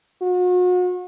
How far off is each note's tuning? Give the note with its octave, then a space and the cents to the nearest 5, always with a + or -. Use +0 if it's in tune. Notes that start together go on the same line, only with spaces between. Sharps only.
F#4 -40